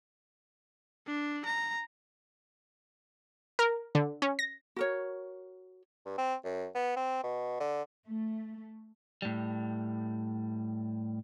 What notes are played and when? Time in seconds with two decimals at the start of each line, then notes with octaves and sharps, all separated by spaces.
1.07 D4
1.45 A#5
3.59 A#4
3.95 D3
4.22 C#4
4.39 A#6
4.76 F#4 A#4 C#5
6.06 G2
6.18 C4
6.44 F#2
6.75 B3
6.97 C4
7.23 B2
7.60 D3
8.06 A3
9.22 A2 G3